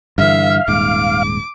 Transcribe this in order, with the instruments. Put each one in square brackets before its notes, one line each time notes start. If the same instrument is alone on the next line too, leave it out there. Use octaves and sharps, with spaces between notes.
[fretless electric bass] G2 D3 E3 [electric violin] E5 [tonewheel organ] F5
[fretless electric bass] D#1 G#2 [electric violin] D6